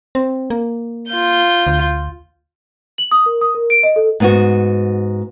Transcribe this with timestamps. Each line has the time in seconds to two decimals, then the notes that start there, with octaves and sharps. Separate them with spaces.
0.15 C4
0.50 A#3
1.10 F4 G6
1.67 D2
2.98 F#7
3.11 D#6
3.26 A#4
3.41 D#6
3.55 A#4
3.70 D7
3.83 D#5
3.96 A4
4.20 G#2 B3 F#4